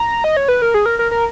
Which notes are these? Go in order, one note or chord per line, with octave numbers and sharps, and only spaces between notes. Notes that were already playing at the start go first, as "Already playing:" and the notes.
Already playing: A#5
D#5
C#5
B4
A#4
G#4
A#4
A#4
A#4